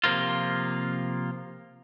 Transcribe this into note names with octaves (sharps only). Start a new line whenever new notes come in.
C3 F3 A#3 F4